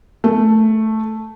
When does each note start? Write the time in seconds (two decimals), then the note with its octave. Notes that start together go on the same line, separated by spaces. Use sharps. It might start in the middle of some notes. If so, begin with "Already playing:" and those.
0.24 A3